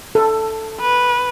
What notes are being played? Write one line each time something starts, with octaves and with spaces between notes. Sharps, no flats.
A4
B4